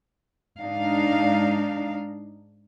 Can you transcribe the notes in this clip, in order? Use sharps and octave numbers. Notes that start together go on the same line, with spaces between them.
G#2 D4 D#4 F5